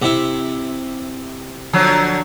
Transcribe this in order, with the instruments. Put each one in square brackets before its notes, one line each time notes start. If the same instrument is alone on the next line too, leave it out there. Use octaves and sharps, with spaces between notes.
[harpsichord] C3 E4
[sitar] D3 F3 F#3